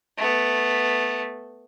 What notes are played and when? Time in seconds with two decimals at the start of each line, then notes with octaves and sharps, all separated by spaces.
0.17 A3 B3